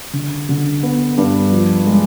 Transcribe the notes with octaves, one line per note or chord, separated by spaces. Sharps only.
D3
D3
B3
G2
F3
G#3